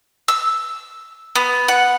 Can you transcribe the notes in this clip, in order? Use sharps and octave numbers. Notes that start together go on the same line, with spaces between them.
E6
B3
F#5